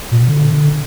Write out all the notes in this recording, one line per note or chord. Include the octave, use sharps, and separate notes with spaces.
A#2
B2
D3
D3